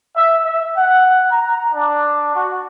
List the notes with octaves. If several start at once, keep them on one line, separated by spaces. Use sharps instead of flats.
E5
E5
F#5
A#5
D4
F#4